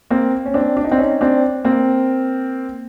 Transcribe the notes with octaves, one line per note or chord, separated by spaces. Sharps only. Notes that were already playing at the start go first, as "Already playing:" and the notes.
A#3 C4
C#4
C4 D4
D4
D#4
C4 D4
C#4 D#4
C4 D4
A#3 C4